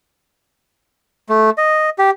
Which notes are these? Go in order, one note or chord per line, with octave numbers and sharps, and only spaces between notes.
A3
D#5
G4